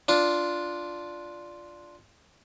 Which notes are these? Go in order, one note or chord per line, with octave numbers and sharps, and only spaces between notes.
D4 F4